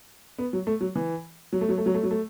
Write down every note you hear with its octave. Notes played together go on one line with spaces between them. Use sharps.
B3
F#3
A3
F#3
E3
F#3
A3
F#3
A3
F#3
A3
F#3
A3